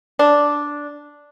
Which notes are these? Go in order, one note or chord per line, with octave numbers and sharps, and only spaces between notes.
D4